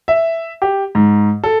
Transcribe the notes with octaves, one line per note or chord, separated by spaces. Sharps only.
E5
G4
G#2
A4